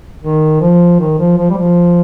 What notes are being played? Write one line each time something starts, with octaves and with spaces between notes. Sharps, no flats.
D#3
F3
D#3
F3
F3
G3
F3